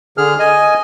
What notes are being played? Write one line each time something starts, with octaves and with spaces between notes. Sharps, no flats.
D3 G#4 F6
D#5 G#5